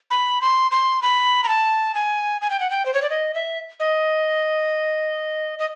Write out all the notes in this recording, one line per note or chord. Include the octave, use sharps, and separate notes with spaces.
B5
C6
C6
B5
A#5
A5
G#5
G#5
G5
F#5
G5
C5
C#5
D5
D#5
E5
D#5
D#5